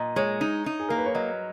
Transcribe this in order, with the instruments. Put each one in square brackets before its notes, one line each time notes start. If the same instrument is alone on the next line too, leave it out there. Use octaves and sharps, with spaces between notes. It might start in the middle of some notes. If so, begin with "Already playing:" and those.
Already playing: [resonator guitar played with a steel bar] A#2 [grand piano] D#5
[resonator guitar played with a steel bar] G#3 [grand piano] C#5
[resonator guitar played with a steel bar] D#4
D#4
[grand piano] G#4
[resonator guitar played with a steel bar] A#3 [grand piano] A#4
[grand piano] B4
C#5
[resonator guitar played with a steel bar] F#3 [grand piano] D#5